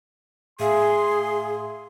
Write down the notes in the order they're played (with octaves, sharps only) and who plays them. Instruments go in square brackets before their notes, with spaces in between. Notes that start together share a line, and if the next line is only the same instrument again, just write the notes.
[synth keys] A2 E5 F5 [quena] G#4 [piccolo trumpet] C6